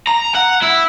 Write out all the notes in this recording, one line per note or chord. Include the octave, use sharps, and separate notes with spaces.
A#5
F#5
E4